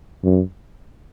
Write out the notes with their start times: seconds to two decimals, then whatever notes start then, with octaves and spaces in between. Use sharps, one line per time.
0.24 F#2